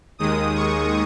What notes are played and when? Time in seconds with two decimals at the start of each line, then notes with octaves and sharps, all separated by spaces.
0.18 D#2 D#3 G#3 D#6
0.55 C#6